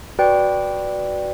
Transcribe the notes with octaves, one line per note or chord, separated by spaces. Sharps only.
F#4 B4 D5 G5